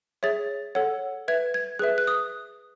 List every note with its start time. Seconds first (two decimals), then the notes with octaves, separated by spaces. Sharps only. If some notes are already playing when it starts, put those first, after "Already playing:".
0.23 G#4 C#5 E5 A6
0.75 A4 C#5 F#5
1.28 B4 E5 G#6
1.54 G#6
1.79 G#4 F#6
1.82 B4 E5
1.98 F#6
2.07 D#6